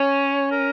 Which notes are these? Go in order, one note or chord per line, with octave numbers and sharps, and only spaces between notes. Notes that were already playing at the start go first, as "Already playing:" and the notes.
Already playing: C#4 C#5
A#4